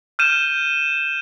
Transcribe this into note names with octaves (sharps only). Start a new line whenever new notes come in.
F6 G6 D#7 E7